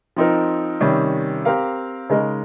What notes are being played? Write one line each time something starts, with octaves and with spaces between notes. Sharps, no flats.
F3 C4 D#4 A#4
C3 D#3 G3 C#4
C4 G4 A#4 F5
C#3 G#3 D#4 A#4 D#5